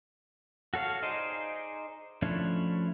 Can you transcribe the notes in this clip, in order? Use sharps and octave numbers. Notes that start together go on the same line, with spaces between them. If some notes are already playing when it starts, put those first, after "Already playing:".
F#4 A4 C#5 F5
D#4 G#4 C5 D5 D#5
F3 A3 C#4 D4 E4